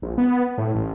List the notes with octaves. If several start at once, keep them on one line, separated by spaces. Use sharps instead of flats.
A#1
B3
A2
A1